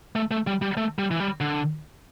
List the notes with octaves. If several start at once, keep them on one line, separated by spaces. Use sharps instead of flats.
A3
A3
G3
G3
A3
G3
E3
G3
D3